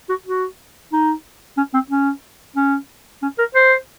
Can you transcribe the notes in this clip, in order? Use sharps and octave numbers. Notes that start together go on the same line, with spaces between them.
F#4
F#4
D#4
C#4
C4
C#4
C#4
C#4
A#4
C5